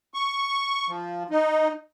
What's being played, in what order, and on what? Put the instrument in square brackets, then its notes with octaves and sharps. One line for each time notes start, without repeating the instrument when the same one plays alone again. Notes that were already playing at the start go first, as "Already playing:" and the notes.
[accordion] C#6
F3
D#4